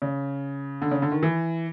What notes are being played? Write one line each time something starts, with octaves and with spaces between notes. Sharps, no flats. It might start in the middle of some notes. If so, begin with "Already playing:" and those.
C#3
D3
C#3
D3
D#3
E3